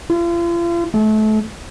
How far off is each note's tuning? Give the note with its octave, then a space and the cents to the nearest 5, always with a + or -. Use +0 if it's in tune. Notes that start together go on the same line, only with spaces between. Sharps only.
F4 -40
A3 -30